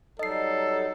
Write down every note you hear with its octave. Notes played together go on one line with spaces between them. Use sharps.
F#3 G3 D#4 A4 D#5 C7